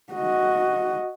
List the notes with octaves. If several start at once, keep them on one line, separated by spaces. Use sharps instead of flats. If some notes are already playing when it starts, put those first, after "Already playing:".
F#4 D#5